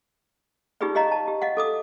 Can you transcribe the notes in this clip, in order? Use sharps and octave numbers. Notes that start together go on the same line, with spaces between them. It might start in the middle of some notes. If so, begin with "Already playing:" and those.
D#4 F4 G4 G#4 B4 D5
G4 C#5 D#5 F5 A#5
A5
G4
D#5 F5 F#5
A4 D6 D#6